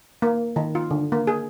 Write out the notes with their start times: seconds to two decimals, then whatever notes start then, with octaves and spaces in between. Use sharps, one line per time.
0.22 A#3
0.56 D#3
0.75 F4
0.91 D3
1.12 A#3
1.27 G#4